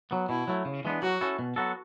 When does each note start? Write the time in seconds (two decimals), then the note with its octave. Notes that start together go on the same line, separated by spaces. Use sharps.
0.11 F#3 B3
0.29 B2 E4
0.48 F#3 A3
0.65 C#3
0.85 E3 G#3 B3 D4
1.02 F#3 F#4
1.21 C#4 E4 A4
1.39 B2
1.56 F#3 B3 F#4 A4